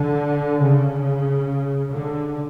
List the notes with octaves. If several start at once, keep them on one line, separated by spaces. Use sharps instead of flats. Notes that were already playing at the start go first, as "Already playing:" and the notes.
Already playing: D3
C#3
D3